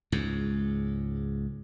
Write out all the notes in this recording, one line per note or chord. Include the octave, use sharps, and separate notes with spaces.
C#2 G#2